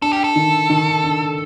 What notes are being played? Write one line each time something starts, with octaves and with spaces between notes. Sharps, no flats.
D4 A4
G4
A4
D#3
D#3
D4